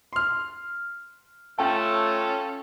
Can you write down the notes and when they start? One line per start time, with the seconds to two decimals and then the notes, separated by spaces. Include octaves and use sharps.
0.13 C6 F6
1.59 A3 C#4 F4 A4 G5 A5